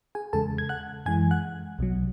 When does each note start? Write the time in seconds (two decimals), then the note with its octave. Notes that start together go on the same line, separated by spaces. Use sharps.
0.15 G#4 G#5
0.33 E2 C#3 G#3 A4 A5
0.58 G#6
0.69 F#5 F#6
1.06 F#2 E3 G#3 G#5 G#6
1.31 F#5 F#6
1.79 B1 B2 F#3